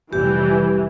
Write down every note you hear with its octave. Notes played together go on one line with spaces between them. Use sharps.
F1 C3 E3 G3 G4